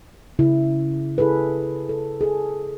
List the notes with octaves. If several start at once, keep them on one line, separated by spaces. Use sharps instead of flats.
C#3 E4
E4 G#4 A4 B4
A4
G#4 A4